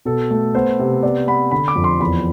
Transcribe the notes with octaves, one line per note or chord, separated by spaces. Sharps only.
B2 A4
A3
B3 C5
C3
B3 D5
B3 B5
D3 B5
D6
F2
C6
E2 B5